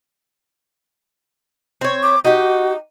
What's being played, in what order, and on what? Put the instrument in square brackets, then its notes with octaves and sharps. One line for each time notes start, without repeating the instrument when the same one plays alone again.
[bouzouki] C4 C#5
[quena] D6
[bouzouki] D#4 G4 [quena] F#4